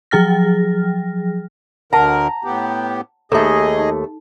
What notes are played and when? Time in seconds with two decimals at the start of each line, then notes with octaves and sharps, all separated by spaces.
0.11 F3 F#3 G#4 G5 F6 A#6
1.93 D2 D3 A#4 F#5 A5 A#5
2.44 A2 B3 G4
3.32 D#2 A3 D#4 G#4 A4 D#5
3.79 D#4